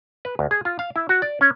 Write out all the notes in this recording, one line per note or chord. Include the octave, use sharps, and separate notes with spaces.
B4
D2
G#4
F4
F5
E4
F#4
D5
C#4